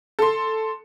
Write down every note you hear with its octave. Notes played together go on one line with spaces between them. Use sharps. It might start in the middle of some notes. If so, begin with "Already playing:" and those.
A4 C6